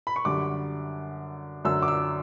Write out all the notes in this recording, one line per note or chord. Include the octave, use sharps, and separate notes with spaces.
B5
C#6
F#2 D3 G3 D6
F#2 D3 F#3 E6
D6
E6